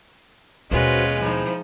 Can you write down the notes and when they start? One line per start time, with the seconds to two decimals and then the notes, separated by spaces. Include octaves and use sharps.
0.71 D#2 B2 G#3 C#4 F4 F#4 B4 C5
1.21 F3 C4 D#4 E4